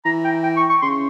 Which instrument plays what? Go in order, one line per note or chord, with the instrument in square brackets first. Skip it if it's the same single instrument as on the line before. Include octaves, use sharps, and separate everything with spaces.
[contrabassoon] E3 [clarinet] A#5
[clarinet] G5
G5
C#6
C#6
[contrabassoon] C#3 [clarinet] C6